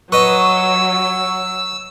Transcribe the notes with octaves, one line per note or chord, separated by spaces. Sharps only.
F#3 B4 D#5 C#6 E6